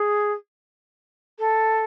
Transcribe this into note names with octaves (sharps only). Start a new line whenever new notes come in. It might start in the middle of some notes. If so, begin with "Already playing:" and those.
Already playing: G#4
A4